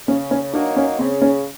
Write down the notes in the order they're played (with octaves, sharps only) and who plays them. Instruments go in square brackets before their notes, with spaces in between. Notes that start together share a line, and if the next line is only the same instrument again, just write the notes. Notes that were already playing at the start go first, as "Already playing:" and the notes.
[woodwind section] C#3 [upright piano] C#4
[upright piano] C#4
[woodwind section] F#3 A#3 D#4 [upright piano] D4
[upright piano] C#4
[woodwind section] C#3 [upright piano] C4
[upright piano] C#4